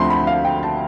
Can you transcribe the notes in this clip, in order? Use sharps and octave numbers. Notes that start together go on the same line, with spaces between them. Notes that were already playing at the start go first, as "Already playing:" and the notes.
Already playing: D2 D3 F3 A3 C4 B5 C6
B5
F5
G5
A5